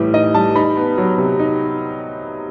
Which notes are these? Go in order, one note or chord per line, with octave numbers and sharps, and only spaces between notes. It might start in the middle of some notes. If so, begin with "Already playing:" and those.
Already playing: A2 E3 G3
D#4 D#5
G3 A5
D#4 B5
B3
F#3
C3
D#4